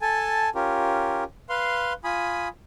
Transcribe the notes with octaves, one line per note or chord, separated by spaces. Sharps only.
A4 G#5 A5
C#4 F4 G4 A#4
B4 F5 C6
F4 G#5 B5 D#6